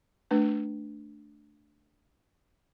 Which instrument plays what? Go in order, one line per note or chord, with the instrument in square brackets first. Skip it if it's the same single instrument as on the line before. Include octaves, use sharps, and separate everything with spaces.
[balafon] A3 D4 B4